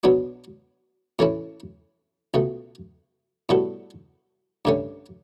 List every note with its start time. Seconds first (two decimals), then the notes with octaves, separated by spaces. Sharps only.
0.04 B2 F#3 B3 D4 F#4
1.19 A2 E3 A3 C#4 E4
2.34 C#2 B2 A3
3.49 A2 G3 B3 F#4 A4
4.65 G2 D3 A3 C#4